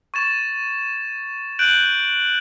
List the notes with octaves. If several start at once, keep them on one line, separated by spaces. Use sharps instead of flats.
C#6 G#6 A6 E7
F#6 G6 D7 D#7 F#7